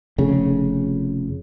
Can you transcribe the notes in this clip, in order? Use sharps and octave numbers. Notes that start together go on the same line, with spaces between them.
F1 C#3